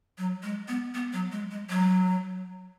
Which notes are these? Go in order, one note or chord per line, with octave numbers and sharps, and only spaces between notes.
F#3
G#3
B3
B3
F#3
G#3
G#3
F#3